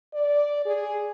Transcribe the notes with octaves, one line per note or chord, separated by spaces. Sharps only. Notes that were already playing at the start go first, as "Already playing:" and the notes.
D5
G#4